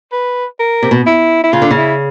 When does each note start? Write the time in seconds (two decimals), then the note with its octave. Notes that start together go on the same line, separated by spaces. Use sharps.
0.12 B4
0.59 A#4
0.83 C3
0.91 B2
1.07 E4
1.44 E4
1.53 C#3 F4
1.62 D3
1.71 C#3
1.77 E4